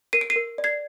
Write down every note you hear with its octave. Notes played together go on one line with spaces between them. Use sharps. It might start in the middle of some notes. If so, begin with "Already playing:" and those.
A#4 C7 D#7
D7
C7 D#7
A#4
D5
G#6 C7